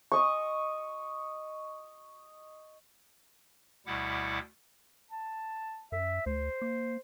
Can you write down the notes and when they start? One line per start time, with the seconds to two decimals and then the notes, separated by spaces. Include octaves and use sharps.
0.12 D#5 C#6
3.86 D2 B2 G3 E4 F#5 D6
5.11 A5
5.92 F#2 E5
6.26 D2 C5
6.62 A#3